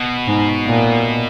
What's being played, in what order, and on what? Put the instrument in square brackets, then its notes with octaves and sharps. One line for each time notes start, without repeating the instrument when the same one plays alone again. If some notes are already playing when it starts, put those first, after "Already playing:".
Already playing: [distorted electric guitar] B2
[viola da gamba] G#2
A#2